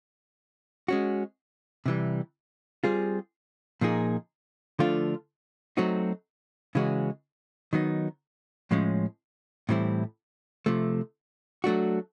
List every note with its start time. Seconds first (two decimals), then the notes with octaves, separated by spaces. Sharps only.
0.88 G#3 C#4 F#4
1.86 C3 E3 G3
2.84 G3 C4 F4 G#4
3.81 A#2 F3 A#3 D#4 G#4
4.79 D3 F3 A3 D4 F4
5.77 F#3 A3 C4 D#4 F#4
6.75 C#3 E3 G#3 C#4 F#4
7.73 D#3 F#3 B3 D#4
8.71 A2 F3 G#3 C#4
9.69 A2 E3 G3 C4 E4
10.66 C3 F3 A3
11.64 F#3 A3 D4 F#4